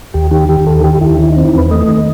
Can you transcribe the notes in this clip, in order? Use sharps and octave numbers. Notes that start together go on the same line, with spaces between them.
D#2 G4
D#3 G4
D#3 G4
D#2 A4
D#3 G4
D#2 E4
D#3 E4
C4 D#4
E4
E2 B4
A3 D#5
D#3